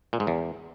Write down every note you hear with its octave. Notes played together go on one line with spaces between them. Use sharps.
A#2
G#2
E2